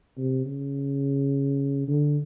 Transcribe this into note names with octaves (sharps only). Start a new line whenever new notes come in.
C3
C#3
D3